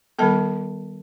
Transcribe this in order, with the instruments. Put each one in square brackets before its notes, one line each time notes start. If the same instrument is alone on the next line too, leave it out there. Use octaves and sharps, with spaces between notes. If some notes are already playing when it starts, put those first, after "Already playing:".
[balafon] D#3 G3 B3 A4 A5